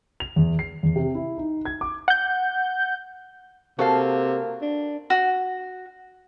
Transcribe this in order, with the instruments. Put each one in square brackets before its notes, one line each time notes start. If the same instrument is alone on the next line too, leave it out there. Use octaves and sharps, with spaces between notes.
[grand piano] F7
E2
C7
E2
C3
E4
D#4
G#6
D6
[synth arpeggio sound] F#5 G6
[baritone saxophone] C3 [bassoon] A#3 [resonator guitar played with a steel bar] F#4 A4 F5
[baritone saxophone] D4
[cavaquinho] F#4